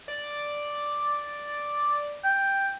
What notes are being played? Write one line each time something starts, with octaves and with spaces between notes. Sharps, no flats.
D5
G5